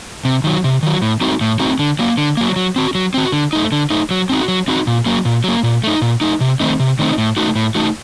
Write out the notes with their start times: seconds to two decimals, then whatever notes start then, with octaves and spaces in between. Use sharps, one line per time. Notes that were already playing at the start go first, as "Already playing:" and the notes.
0.25 C3
0.44 D#3 F#3
0.64 C3
0.83 D#3 F#3
1.02 A2
1.21 A3 C4 D#4 F#4
1.41 A2
1.60 A3 C4 D#4 F#4
1.79 D3
1.99 F#3 A#3
2.18 D3
2.37 F#3 A#3
2.56 F#3
2.76 C4 F#4
2.95 F#3
3.14 C4 F#4
3.32 D3
3.53 A3 D#4
3.72 D3
3.90 A3 D#4
4.11 F#3
4.30 C4 D#4 F#4
4.48 F#3
4.68 C4 D#4 F#4
4.87 A#2
5.06 F#3 A#3
5.25 A#2
5.44 F#3 A#3
5.63 A#2
5.84 A3 D#4
6.02 A#2
6.21 A3 D#4
6.41 C3
6.60 D#3 A3 C4 D#4
6.80 C3
6.99 D#3 A3 C4 D#4
7.18 A2
7.37 A3 D#4 F#4
7.56 A2
7.75 A3 D#4 F#4